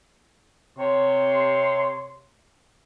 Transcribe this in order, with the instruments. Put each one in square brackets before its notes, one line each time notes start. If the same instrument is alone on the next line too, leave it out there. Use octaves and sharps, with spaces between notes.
[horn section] C3 C#5 C6